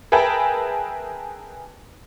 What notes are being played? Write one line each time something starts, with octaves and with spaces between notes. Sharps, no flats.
G#4 A#4 B4 E5 G5 A5